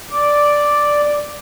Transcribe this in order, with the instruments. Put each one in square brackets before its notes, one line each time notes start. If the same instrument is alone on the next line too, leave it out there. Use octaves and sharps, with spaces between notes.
[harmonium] D5